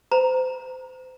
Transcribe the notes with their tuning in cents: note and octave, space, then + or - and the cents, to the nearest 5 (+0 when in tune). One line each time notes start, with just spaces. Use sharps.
C5 -35 A#5 +0